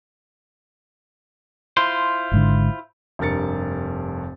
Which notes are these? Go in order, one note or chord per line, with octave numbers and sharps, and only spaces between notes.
E4 F4 C5
G#1 G#2 D3
F1 G2 A#4 A6 C#7